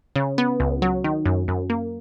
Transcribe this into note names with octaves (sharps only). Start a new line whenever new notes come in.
C#3
B3
C#2
F#3
D#3
F#2
F#2
A#3